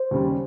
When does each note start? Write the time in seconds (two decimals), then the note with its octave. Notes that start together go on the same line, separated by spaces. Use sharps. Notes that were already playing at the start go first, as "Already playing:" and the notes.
Already playing: C5
0.11 D#2 C#3 G3